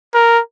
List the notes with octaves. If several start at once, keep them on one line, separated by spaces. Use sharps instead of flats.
A#4